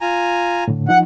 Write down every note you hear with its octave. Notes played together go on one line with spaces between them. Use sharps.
F4 G#5 A#5
A2 D3
F3 D#4 F#5